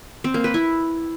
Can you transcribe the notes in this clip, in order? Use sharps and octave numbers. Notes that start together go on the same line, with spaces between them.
C4
A#3
B4
E4